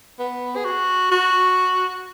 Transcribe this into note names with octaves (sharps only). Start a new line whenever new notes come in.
B3
G#4
F#4
F#4